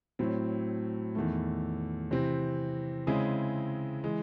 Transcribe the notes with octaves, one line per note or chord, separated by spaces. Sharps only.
A2 F#3 C4
E2 D#3 A3
C3 E3 C4
C#3 G#3 C4 E4 G#4
E3 G#3